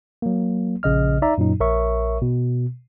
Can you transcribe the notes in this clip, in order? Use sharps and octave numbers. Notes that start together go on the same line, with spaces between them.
F#3 A#3
A#1 C#3 D#5 F6
D#4 D5 E5 A#5
F#2 A#2 F#3 D#4
A#1 A#4 C#5 E5 C#6
B2